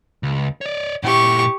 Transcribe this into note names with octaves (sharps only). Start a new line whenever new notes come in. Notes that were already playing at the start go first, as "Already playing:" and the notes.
C#2
C#5 D5
A#2 E4 G4 C#6